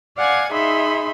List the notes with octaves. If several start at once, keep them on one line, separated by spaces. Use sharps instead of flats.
D5 F5 F#5 G#5 G#6
D#4 G#4 E5 B5 C6